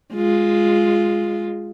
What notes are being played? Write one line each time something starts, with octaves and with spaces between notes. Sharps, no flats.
G#3 F4